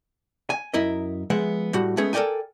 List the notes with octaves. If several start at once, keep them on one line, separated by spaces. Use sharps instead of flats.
G#5
F#2 E4 A#4 D#5
F3 G#3 B3 E5 F#5
A2 G3 F#4
G#3 A3 B3 C#4 G#4
A4 A#4 C#5 D5 G5 G#5